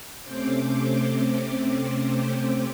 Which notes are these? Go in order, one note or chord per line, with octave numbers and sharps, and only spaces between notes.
C3 A3 C4 C#4 C5 D6